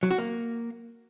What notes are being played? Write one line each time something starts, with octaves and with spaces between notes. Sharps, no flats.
F#3
F#4
A#3